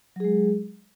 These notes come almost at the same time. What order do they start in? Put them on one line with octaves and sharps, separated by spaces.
F#3 G#4 G#3